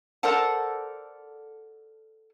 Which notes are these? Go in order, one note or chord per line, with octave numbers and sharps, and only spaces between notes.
A4 A#4 C5 D5 F#5 A5